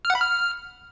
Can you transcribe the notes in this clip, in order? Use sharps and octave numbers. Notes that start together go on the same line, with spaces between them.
F6
F#5
B5
F6